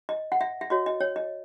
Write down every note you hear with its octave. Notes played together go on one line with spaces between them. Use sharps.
D#5
F#5
E5
E5
F#4 C#5 D#5
D#5
C#5
D#5